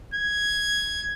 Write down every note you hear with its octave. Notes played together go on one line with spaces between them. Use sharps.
G#6